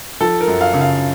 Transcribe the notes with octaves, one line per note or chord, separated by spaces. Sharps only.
F3 A4
A#4
F#2
F5
C#3
F5